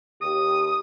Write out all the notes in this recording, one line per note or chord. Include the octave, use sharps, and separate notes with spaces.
D#2 G4 D#6